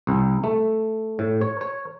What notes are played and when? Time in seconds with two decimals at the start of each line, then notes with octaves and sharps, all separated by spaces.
0.07 C2
0.44 A3
1.19 A2
1.41 C#5
1.61 C#5